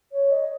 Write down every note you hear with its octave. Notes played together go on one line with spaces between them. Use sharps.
C#5
D#5